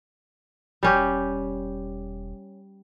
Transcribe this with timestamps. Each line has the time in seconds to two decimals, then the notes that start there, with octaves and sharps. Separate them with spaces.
0.83 E1 G3 C#4 G4